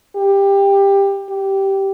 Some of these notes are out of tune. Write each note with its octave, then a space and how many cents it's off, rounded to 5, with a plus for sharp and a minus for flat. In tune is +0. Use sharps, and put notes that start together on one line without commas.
G4 +15
G4 -10